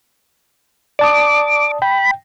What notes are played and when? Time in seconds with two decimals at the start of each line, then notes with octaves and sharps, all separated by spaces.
0.99 D5 A5 D6 D#6
1.82 G5 B5